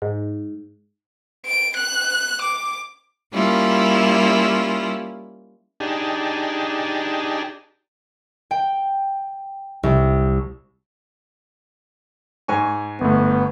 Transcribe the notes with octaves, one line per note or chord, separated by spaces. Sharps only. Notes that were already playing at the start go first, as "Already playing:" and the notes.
G#2
D7
F#6
D6
G3 A#3 C#4 E4 F4
D4 D#4 G4 G#4 A5
G5
C2
G#2 G#5 C#6
G1 A3 B3